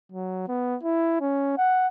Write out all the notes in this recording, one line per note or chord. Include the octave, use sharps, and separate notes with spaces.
F#3
B3
E4
C#4
F#5